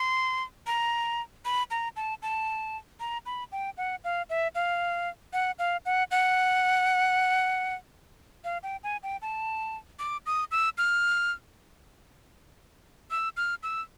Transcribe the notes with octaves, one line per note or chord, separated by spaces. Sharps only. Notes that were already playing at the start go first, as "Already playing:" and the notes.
Already playing: C6
A#5
B5
A#5
A5
A5
A#5
B5
G5
F#5
F5
E5
F5
F#5
F5
F#5
F#5
F5
G5
G#5
G5
A5
D6
D#6
E6
F6
E6
F6
E6